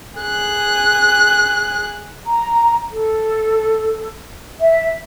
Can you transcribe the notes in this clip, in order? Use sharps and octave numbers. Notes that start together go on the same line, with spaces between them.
G#4 F#6
A#5
A4
E5